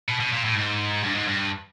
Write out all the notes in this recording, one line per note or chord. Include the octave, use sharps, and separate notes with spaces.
B2
B2
A#2
A2
G#2
G2
G#2
G2